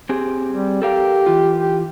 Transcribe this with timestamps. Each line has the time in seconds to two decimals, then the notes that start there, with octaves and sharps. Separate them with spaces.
0.09 C4 G4 G#4
0.51 G3
0.82 G4 A4 A#4 F5
1.26 E3 F4
1.58 G4